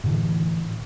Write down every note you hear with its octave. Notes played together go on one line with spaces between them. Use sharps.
A2 D3 E3